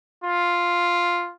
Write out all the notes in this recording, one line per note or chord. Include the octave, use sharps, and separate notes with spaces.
F4